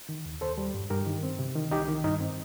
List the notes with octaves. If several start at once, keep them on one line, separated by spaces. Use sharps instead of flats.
D#3
D#2
D#2 A4 C5
G3
G2
G2 G4 A#4
D#3
C4
C3
D#3
C2 D#4 G4
D#3
G2 D#4
C4